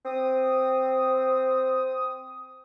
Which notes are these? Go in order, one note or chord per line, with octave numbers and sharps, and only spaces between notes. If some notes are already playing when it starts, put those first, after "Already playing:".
C4 D#6